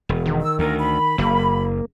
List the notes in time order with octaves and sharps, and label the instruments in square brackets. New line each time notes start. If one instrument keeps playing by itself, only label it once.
[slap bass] E1
[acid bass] D#3
[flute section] E6
[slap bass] D2 [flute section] A#4
[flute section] B5
[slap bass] F#1 [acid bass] A#3